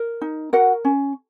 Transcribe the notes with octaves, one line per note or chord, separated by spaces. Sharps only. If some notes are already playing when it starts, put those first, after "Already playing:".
Already playing: A#4
D#4
F#4 A#4 F#5
C#4